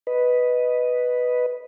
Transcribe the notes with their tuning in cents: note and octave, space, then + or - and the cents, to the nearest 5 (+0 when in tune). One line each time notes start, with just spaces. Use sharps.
B4 +0 D#5 +0